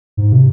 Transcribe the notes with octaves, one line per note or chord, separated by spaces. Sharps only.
G#2
C3